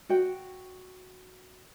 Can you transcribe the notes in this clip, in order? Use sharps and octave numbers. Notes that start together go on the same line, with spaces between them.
F#4 G5